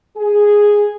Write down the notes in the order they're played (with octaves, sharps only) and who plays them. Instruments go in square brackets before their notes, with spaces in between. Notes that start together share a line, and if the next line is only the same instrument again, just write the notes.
[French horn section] G#4